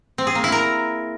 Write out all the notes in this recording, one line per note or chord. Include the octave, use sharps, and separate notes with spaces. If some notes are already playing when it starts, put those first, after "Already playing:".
C4
G#4
A#3
E4
A#4